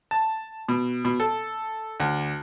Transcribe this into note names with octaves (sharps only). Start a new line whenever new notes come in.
A5
B2
B2
A4
D2